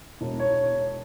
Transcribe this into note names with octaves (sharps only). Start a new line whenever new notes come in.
E1
C#5